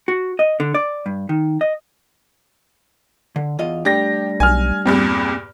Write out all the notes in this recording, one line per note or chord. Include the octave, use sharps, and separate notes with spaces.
F#4
D#5
D3
D5
G2
D#3
D#5
D3
E2 F4 D#5
G3 A3 D4 G4 A#6
B1 G#5 F6
E2 G2 A#2 C4